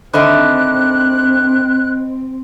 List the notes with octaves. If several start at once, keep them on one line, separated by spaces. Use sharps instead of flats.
D3 D#3 A3 C4 C5 D#5 B5 F#6